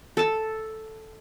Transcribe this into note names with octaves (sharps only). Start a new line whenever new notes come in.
A4 A5